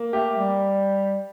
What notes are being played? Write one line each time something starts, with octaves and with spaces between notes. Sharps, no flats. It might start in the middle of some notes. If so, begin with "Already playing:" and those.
Already playing: A#3
A3 G4
G3